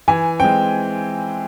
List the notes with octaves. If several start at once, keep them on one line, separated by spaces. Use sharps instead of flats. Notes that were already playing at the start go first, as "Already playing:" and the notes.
E3 G#5
G#3 C4 G5